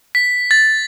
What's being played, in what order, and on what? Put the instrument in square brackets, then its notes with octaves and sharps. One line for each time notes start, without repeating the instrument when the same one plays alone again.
[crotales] B6
A6